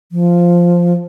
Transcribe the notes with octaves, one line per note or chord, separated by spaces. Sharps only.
F3